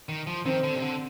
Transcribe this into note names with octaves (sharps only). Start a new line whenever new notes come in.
D#3
F3
D#3 C4
D3
C3
D3